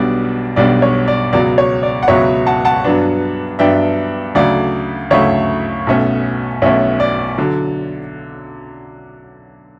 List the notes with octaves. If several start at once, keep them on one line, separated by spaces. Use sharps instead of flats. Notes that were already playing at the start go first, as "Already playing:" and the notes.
Already playing: B1 B2 G3 D4 D5
B1 B2 G3 D4 D5
C#5
D5
C#2 B2 F#3 D5
C#5
D5
F#5
C#2 B2 F#3 C#5 E5
F#5 A5
F#5 A5
G2 F#3 B3 D4
G2 F#3 B3 D4 E5 G5
D2 C#3 F#3 A3 D5 F#5
D2 C#3 F#3 A3 C#5 E5
B1 B2 A3 C#4
B1 B2 A3 C#4 C#5 E5
D5
D3 F#3